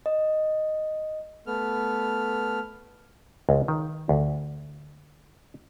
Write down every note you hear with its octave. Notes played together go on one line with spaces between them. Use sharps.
D#5
A3 B3 F6
C#2
D#3
D2